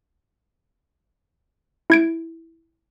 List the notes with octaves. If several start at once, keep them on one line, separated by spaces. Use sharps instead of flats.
E4 G#6 D7